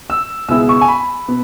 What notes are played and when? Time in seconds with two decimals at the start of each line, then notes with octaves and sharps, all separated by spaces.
0.10 E6
0.48 C#2 B2 B3 E4 G#4 E6
0.69 C#6
0.81 G#5
0.88 B5
1.28 B2 B3